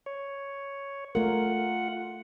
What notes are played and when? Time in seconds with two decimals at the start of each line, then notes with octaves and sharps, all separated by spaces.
0.06 C#5
1.15 A3 F4 A#4 F#5